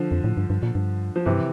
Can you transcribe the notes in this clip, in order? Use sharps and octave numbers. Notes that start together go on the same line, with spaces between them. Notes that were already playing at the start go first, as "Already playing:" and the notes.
Already playing: D3 F3
F2
A2
G2
G2
A#2
G2
F3
G2 C3 E3